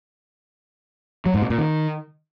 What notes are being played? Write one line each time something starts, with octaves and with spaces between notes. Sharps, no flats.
F#3
G#2
B2
A#2
D#3